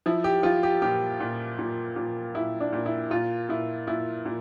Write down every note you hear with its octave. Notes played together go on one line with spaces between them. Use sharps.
F3 E4
G4
F3 F4
G4
A#2 G4
A#2
A#2
A#2
A#2 E4
D4
A#2
E4
A#2 F4
A#2 E4
A#2 E4
A#2